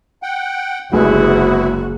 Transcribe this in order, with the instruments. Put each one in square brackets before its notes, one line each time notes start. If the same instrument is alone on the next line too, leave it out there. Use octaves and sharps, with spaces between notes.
[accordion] F#5 G5
[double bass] F#1 [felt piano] C2 G#3 B4 [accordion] B3 E4 [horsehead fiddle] F#4